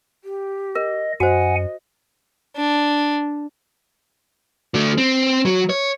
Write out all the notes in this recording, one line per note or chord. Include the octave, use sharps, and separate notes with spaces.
G4
A#4 D#5
F#2 F#4 C5 D#5 F#5 G#5
D4
D3 A3
C4
F#3
C#5